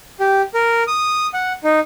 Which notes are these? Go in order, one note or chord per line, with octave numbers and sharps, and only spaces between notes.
G4
A#4
D#6
F#5
D#4